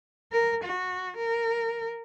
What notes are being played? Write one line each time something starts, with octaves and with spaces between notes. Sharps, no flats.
A#4
F#4
A#4